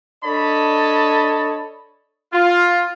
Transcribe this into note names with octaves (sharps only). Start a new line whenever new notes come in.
D4 A4 C#5 D#5 A5 B5
F4